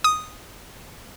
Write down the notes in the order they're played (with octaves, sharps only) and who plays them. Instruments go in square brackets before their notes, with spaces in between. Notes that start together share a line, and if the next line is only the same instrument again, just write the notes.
[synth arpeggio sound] D#6